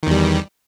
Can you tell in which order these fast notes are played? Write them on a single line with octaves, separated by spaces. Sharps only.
D#3 E2 G3